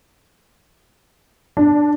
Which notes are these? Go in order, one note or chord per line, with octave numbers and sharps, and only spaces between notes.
D4